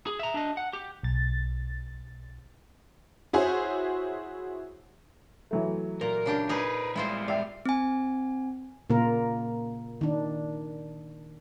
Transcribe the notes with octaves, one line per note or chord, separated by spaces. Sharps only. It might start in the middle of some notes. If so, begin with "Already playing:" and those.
G#4
E5 A#5
D4 D#5
F#5
G4
B1 A6
E4 F#4 G#4 C5 C#5
E3 F#3 A3
A#2 A#4
C#3 D4 G4
D#4 G#4 A#4 B4
G3 G#3 E4 F4 C5
D5 E5 F5 G5
C4 G#5
A#2 C#3 A#3 F4 A#4
D#3 D4